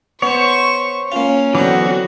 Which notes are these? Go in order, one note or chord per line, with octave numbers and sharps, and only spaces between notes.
B3 C5 C#5 C#6
A#3 C#4 F4
D3 E3 F#3 B3 C4 F#4